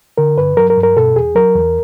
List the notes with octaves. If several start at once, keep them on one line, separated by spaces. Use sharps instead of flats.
D3 A#4
G2 B4
F#3 A#4
A#4
G2
A#4
B2 A4
E2 G#4
F#3 A#4
E2